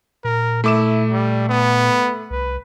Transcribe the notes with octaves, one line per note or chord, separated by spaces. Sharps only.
A#2 A#4
A3 E4 D6 E7
G3
B3
C2 B4